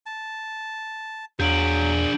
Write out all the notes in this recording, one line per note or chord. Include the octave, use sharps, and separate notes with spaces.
A5
E2 F#3 D4 G#4 G6 D7 F#7